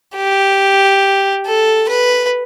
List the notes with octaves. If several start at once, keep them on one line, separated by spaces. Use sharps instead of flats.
G4
A4
B4